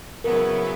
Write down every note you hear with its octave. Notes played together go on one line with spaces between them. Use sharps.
C#3 F#3 B3 E4 A#4